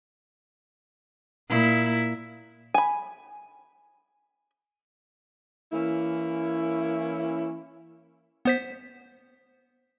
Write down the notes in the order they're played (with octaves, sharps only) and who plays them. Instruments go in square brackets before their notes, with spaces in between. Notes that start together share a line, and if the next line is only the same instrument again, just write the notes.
[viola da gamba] A#2 E4
[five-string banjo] G#5 B5
[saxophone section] E3 A#3 C#4 E4
[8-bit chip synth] B3 C5 B6